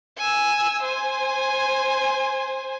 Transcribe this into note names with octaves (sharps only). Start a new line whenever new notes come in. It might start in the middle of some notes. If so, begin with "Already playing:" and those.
G#5 E6
C5 G#5